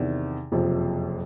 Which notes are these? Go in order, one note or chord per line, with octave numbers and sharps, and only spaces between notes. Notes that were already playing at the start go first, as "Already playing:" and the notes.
Already playing: E2 C3 D#3
F#1 F2 C3 F3